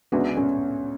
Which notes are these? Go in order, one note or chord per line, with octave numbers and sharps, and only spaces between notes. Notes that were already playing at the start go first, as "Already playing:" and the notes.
D2 C#3 G#3 B3 D4 F#4
C#4